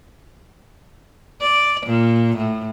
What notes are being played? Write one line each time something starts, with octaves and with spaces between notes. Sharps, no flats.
D5
A#2
A2